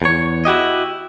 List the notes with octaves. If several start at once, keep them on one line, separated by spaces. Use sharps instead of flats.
E2 C#5
E4 F#4 G4 D#5